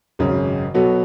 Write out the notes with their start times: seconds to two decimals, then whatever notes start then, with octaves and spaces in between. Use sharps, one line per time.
0.19 G#1 F#2 C#3
0.74 B2 F#3 B3 F#4 A4